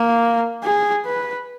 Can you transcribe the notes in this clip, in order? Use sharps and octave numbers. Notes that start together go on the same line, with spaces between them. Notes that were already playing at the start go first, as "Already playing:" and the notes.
Already playing: A#3
G#4
B4